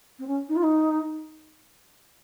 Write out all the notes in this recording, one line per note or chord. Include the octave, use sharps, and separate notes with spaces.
C4
C#4
D#4
F4
D#4